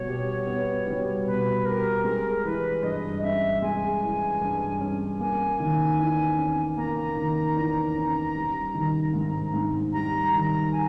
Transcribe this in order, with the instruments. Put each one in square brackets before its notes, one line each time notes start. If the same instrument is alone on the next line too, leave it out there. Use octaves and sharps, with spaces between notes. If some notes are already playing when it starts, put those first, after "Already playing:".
Already playing: [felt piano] B2 G3 [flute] C#5
[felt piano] G4
B3
G3
[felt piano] B2 [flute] B4
[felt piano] G4 [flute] A#4
[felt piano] G#3 [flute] A#4
[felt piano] E3 [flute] B4
[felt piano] G2 [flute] D#5
[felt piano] C#4 [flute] E5
[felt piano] G#3 [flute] G#5
[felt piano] E3
G2
C#4
[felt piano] A#3 [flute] G#5
[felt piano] D#3
E2
C#4
[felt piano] A#3 [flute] A#5
[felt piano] D#3
E2
C#4
G3
D#3
G#2
G#2
[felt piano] G3 [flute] A#5
[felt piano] D#3 [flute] A#5
[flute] G#5